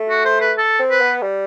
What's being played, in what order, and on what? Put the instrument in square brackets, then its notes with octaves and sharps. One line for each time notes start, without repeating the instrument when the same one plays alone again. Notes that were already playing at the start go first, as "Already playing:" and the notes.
Already playing: [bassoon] A3
[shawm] F#4
C5
B4
A4
[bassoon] C4
[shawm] B4
[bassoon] B3
G3